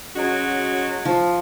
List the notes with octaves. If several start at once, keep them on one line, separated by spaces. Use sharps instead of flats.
F#3 G#3 C#4 F#4
F3